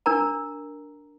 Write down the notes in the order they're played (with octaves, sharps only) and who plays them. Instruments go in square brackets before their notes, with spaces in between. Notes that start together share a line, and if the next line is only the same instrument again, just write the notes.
[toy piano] D4 A#4 A#5